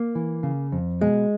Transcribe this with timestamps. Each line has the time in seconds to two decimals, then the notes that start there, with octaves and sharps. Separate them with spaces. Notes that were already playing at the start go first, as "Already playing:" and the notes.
Already playing: A#3
0.15 E3
0.43 C#3
0.72 F2
1.01 B2 G#3